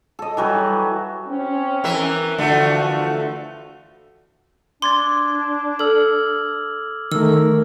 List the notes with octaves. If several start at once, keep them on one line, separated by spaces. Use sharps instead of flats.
A4 D#5
E3 F#3 G3
C4 C#4
E3 A#4 E5
D3 E3 F3 A3 F#4
D4 C6 D6 G#6 A6
A4 E6 F6 F#7
D#3 A3 A#4 E6